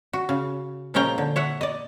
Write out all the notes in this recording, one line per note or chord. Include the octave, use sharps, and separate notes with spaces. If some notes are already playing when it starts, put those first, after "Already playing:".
F#4
C#3
A#2 F3 G#3 C#4 G5 A#5
D3
C#5 E5 F#5
D5 D#5